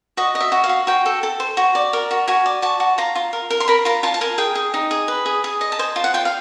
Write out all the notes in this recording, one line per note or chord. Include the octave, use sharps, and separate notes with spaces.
F#4 D#5
D#5
E5
F#4
F5
F#4
F#4 G5
A4
A4
C5
F#4
D5
A#4
F#4
F#4 G#5
D5
F#4 A5
F#4
F4 A#5
F4
A#4
A#4
C6
A#4 B5
F4 A#5
F4 A5
A5
A#4 G#5
G#4 G5
G#4
D#4
G#4
B4
G#4
G#4
D#5
A5
C5 G#5
F4
F#5
F4 G5
F5